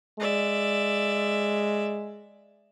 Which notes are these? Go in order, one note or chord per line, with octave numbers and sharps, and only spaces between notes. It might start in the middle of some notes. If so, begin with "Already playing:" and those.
G#3 D5 E5